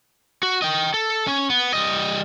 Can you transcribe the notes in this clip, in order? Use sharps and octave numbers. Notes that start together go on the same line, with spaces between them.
F#4
D#5 G5
A4
C#4
B3
G3 D#5